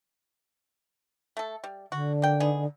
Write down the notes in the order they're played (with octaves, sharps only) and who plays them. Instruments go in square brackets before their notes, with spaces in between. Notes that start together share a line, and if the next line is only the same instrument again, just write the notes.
[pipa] A3 A4
G3
[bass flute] D3 [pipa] F#4
[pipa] A#3 G5
B3 D#4 G#4